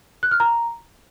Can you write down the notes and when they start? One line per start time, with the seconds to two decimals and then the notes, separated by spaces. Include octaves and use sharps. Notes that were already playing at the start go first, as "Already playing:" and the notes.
0.23 F#6
0.31 F6
0.40 A#5